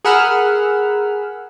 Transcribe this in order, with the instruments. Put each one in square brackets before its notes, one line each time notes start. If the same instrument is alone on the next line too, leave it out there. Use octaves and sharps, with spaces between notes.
[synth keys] G#4 A#4 F#5 B5 E6 F6